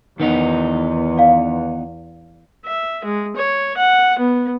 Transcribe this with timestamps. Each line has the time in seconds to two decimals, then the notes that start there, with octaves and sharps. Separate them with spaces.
0.20 E2 D#3 B3 D#4
1.18 D5 F5
2.65 E5
3.05 G#3
3.36 C#5
3.77 F#5
4.19 B3